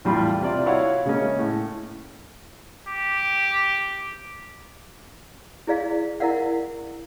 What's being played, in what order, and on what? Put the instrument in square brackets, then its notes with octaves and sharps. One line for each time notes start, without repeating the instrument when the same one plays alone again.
[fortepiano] E2 A2 G3 F4 B5 C6
C3 F4 D5
E4 F#4 C#5 F5 F#5
C#3 G#3 A#3 C#4
A2
[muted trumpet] G4
[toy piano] E4 G#4 D5 F5
E4 A#4 D5 F5 F#5